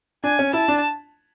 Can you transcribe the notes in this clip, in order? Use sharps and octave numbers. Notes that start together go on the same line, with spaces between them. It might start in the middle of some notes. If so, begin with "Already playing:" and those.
D4 G#5
C#4
E4 A5
D4